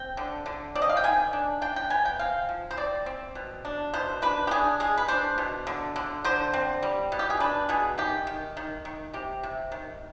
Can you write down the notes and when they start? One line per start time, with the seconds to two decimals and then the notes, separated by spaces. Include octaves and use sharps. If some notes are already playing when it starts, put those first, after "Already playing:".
Already playing: C4 G5
0.17 D3
0.46 D3
0.75 C4 D5
0.82 D#5
0.89 F5
0.97 G5
1.04 D#3 G#5
1.33 D4
1.62 D4 G5
1.76 G5
1.90 B3 G#5
2.05 G5
2.19 C4 F5
2.49 F3
2.71 C5
2.77 C4 D5
3.06 C4
3.35 B2
3.65 D4
3.94 B2 C5
4.22 D4 B4
4.47 G4
4.51 D4 G#4
4.80 G#3 G#4
4.98 B4
5.08 D4 C5
5.38 B2
5.67 D3
5.96 D3
6.24 D3 C5
6.54 C4
6.83 G3
7.12 B2
7.19 G4
7.30 G#4
7.40 D4 B4
7.69 B2 G#4
7.98 D#3 G4
8.27 D#3
8.57 D#3
8.85 D#3
9.13 C3 G4
9.43 C3
9.72 D#3